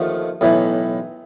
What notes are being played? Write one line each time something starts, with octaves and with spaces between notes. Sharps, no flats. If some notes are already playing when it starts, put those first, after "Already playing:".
Already playing: D#2 D3 F3 A3
B1 A2 E3